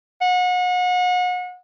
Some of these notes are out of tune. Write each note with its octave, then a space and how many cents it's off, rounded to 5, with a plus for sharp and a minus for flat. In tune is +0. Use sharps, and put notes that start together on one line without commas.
F#5 -35